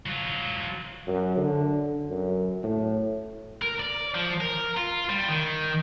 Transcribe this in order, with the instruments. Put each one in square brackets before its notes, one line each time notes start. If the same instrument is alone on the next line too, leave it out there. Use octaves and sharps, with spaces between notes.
[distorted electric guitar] F#3 F4
[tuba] F#2
D3
F#2
A2
[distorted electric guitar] A#4
D5
F3
A#4
F4
G3
D#3